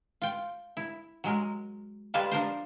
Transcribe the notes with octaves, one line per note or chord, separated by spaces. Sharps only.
F4 G5
E4
F#3 G#3 A#4
G3 G#3 A#3 F4 B4 A5
F3 D4 A#4 C5